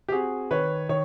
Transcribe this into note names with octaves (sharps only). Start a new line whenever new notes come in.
G4
C4 F#4 G#4
D#3 B4 C#5
D#3 C#5